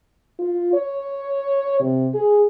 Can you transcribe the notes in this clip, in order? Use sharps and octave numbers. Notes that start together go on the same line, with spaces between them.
F4
C#5
C3
G#4